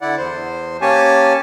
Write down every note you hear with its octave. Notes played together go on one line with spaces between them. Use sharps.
D3 E4 D5 F#5
E2 C5
A#3 C#4 G4 C#5 G#5 A5